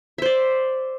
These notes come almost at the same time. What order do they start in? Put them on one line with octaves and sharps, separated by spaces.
E5 C5 D5